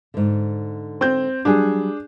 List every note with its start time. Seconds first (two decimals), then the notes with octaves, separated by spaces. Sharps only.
0.14 G#2 D3
1.01 C4 G6
1.45 F#3 G3 D4 F#4 G#4